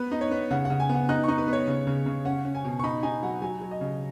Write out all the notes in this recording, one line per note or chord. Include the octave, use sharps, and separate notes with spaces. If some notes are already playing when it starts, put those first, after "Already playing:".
Already playing: B3 B4
D#4
C#5
B3
C#3 F#5
F#5
C#3
G#5
B3
F#5
D#4 F#6
D#4 C#6
B4
B3 C#5
C#3
C#3
C#3
C#4 F#5
C#4
G#5
B2
C#6
D#4 B5
D#4 G#5
F#3 F#5
F#3 G#5
F#3
D#5
C#3